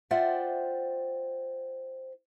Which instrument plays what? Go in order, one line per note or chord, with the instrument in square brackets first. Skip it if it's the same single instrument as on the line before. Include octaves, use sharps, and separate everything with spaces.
[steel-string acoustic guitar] F4 C5 D5 E5 F#5 G5